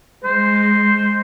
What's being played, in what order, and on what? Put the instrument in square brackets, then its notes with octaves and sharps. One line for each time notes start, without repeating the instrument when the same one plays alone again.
[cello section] G#3 [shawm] C5